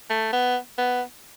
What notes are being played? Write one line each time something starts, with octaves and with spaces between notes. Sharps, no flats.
A3
B3
B3